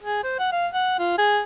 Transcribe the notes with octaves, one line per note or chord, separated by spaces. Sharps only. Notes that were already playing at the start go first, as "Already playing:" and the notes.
G#4
C5
F#5
F5
F#5
F4
G#4